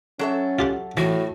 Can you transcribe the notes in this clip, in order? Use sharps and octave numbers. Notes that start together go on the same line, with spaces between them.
F#3 C#4 A4 E5
F4 G4 F#5
A2 E3 F#4